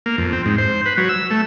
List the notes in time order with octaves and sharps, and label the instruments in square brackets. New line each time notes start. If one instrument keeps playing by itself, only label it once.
[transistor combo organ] A#3
F2
C4
G#2
C5
B4
F#3
E6
A3